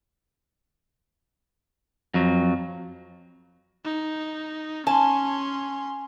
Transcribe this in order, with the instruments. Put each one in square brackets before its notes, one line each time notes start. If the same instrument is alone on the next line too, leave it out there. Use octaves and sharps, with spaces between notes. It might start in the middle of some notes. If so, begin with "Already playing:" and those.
[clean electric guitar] F2 F#3
[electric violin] D#4
[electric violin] C#4 C6 [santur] G#5 [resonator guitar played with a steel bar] A5